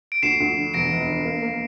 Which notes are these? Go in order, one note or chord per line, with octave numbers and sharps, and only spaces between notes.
D7
D2 C7 E7
D2
D3
E1 A#6 D7
E1
D3
A#3
A#3